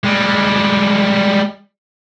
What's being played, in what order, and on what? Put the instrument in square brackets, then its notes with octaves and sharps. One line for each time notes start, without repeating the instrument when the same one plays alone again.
[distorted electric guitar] G3 G#3